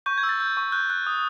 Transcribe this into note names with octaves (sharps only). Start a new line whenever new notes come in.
C#6 G6
G#6
E6
A6
G6
C#6
F#6 G6
F#6
D#6